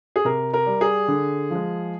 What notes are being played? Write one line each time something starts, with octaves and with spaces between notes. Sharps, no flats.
G#4
C3 A#4
A#4
G3
G#4
D3
F3 G#3